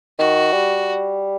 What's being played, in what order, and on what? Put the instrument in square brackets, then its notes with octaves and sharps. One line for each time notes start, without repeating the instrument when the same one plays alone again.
[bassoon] D#3 [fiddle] F#4
[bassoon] G3